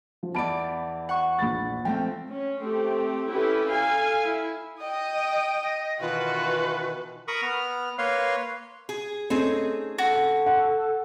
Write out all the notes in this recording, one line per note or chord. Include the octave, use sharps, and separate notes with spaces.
F3
E2 D5 A5 B5 D7
F#5 C#6
A#1 B5 A6
F3 A3 C4 G5
C#4
A3 C4 G4
C#4 E4 G4 A4 B4
A4 F5 G#5
E4
D#5 G5 D#6
D#5
B2 D#3 E3 F4 F#4 B4
A#4 B5 C#6 D#6
B3 F6
A#3 B4 C#5 F5 C6
G#4
A3 C4 C#4 D#4 G#4
F#4 A4
F#5